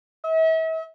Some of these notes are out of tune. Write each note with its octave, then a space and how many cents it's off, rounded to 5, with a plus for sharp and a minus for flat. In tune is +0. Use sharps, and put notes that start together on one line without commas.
E5 -40